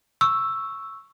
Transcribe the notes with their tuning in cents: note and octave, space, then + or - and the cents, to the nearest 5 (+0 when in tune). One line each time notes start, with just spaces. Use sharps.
C#6 +0 E6 +0